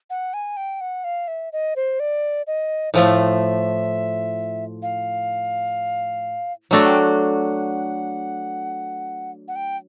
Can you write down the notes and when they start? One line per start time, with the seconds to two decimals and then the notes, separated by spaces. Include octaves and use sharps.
0.10 F#5
0.34 G#5
0.57 G5
0.81 F#5
1.04 F5
1.28 E5
1.53 D#5
1.76 C5
2.00 D5
2.47 D#5
2.94 A2 F3 A3 E5
4.83 F5
6.71 F#3 A3 D4 F#4 A4 F#5
6.86 G5
7.00 F#5
9.48 F#5
9.56 G5